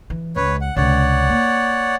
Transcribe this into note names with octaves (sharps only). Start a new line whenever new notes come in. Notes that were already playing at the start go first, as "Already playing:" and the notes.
E3
C#2 B4 C#5
F#5
C#2 C3 C#5 D5 F#5
A#3